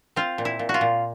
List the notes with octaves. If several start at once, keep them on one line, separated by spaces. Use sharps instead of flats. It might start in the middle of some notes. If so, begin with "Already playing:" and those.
C4 F4
A#2
E4
A#2
F#4
F4
A#2